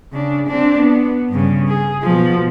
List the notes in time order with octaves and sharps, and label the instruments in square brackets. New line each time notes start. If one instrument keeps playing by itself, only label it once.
[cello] C#3 D4
C4 D4
B3
G2 C#3
G#4
B2 F3